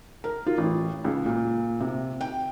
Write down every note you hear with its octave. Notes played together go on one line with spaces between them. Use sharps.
A#4
F4
A1
C#2
A#2
C3
G5